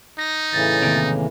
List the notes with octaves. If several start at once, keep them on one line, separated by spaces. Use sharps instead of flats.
D#4 A#6
A2 C#3 E3 A6
D#2 C3